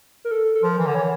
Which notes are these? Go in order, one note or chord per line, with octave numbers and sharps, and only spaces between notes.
A#4
A4
A4
F3 A#4
E3
D3
E3 C#5